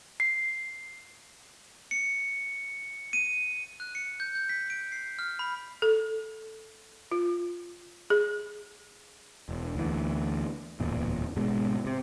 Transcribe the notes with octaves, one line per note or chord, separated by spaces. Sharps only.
C7
C#7
D#7
F#6
C#7
G6
G6
B6
D7
C7
F6
B5
A4
F4
G#4
E1
D2 E3
D1 E2 A#2
G#1 B2 G#3
C3